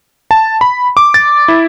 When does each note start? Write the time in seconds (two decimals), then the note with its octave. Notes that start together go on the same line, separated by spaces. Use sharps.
0.31 A5
0.61 B5
0.97 D6
1.14 A6
1.48 E4